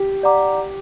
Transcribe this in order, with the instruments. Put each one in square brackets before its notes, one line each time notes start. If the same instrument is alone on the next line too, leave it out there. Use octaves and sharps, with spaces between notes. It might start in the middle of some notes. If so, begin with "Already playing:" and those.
Already playing: [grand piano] G4
[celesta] D5 F#5 A#5 D6